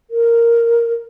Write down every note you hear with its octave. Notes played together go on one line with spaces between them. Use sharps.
A#4